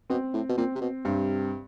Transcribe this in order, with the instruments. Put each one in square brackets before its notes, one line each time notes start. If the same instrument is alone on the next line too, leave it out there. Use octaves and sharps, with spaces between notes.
[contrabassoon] B2 [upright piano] C4
[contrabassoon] A2
B2
[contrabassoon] A#2 [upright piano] C4
[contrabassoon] C3
B2
[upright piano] G2 [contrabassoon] C3